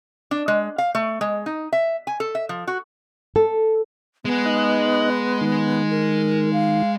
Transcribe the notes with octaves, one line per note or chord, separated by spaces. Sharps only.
D4
G#3
F5
A3
G#3
D#4
E5
G#5
A4
E5
F3
F#4
A4
G#3 B3 G#4
D#4 D#5 F#6
D#3
A#4
F5